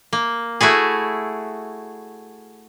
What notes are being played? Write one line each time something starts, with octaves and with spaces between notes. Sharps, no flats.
A#3
A3 E4 F#4 G#4